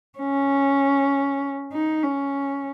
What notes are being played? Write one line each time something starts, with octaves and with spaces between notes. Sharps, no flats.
C#4
D#4
C#4